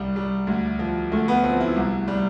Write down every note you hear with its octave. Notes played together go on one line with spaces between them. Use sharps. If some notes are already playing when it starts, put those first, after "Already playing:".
Already playing: C2 G3
G3
D2
F3
D2 A3
B3
F3 C4
E4
C2
G3